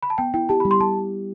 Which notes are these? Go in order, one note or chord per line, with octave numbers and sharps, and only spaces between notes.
B5
A5
B3 G5
E4 G5
G4 A5
G3 B5
C6
G3 A5